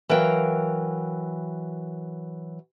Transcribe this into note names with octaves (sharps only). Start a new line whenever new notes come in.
E3 F#3 A#4 F5 G5